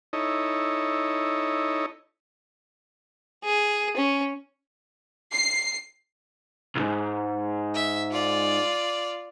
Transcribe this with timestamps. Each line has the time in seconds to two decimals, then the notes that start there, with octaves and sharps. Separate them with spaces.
0.13 D#4 E4 A4 C#5 D#5
3.44 G#4
3.97 C#4
5.32 C7
6.75 B1 G#2
7.74 E5
8.11 F4 D5